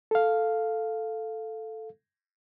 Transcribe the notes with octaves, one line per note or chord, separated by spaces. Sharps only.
A4 F5